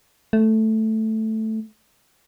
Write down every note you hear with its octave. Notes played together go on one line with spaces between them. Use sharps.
A3